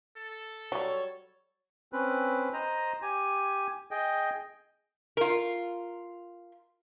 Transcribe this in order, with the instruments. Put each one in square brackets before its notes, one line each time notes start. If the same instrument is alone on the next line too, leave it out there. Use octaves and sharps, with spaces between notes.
[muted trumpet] A4
[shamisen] F#3 G3 [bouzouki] C#5
[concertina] C4 C#4 B4
C5 D#5 A#5
G4 G#5
G#4 D#5 G5
[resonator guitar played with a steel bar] F4 A#4